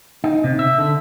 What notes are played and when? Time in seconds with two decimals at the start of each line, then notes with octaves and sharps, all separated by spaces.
0.24 D#4
0.44 C3
0.59 E5
0.78 D3